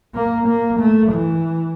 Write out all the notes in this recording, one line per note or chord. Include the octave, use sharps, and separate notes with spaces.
A#3
A#3
A3
E3